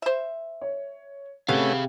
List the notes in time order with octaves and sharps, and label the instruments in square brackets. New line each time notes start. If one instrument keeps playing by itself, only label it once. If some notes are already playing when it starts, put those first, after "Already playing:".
[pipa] C5 E5
[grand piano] C#5
[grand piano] C3 [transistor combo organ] A3 C#4 [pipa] B3 [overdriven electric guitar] G#4 F5